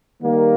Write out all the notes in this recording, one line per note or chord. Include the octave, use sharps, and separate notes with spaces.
D#3 G3 A#3